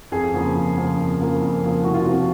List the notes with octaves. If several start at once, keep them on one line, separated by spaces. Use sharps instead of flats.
F2 G#4
C#3 F3 A#3
F2
C#3 F3 A#3
F2
C#3 F3 A#3
F2
C#3 F3 A#3
C2 F#4
F4
C3 F3 C4 F#4